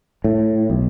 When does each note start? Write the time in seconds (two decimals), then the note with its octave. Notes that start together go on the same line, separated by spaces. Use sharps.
0.24 A2
0.70 B1